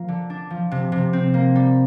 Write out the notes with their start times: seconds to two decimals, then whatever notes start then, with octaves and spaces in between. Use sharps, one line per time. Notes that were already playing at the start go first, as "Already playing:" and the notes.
Already playing: F3 A#3
0.08 D3
0.30 D4
0.50 F3
0.71 C3
0.92 C3
1.13 C4
1.34 A#3
1.56 G3